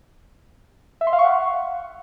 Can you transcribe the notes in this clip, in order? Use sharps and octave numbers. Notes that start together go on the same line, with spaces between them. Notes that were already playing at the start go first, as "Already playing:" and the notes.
E5
C6
F5
C#6
F#5